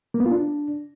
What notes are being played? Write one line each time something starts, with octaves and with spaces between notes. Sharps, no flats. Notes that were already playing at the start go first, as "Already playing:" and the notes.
A#3
B3
F4
D4